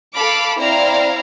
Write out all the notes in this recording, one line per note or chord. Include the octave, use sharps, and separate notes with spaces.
A4 F5 B5 D6
C4 E4 D5 F5 A#5